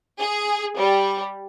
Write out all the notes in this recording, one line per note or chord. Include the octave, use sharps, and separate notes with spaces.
G#4
G3